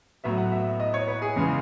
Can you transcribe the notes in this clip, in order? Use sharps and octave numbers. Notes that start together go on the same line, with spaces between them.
A2 F#3 B3 E5
F#5
E5
D#5
C#5
B4
G#4
E2 C#3 G#3 B3